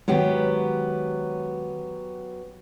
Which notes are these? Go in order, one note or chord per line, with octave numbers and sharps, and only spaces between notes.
D#3 F#3 G#3 B3 G4